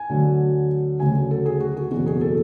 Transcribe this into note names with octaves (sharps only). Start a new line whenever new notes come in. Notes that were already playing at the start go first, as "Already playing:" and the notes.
Already playing: G#5
D2 D3 F#3
D2 C#3 F#3 G#5
A4
G#4
F#4
G#4
F#1 E2 B2 F#3 F#4
G#4
A4